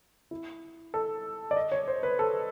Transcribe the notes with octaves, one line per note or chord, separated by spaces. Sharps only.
E4
A4
D5
D#5
C#5
C5
B4
A4